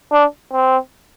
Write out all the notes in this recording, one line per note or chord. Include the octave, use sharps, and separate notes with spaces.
D4
C4